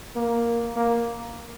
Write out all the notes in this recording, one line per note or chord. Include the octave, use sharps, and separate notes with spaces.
A#3
A#3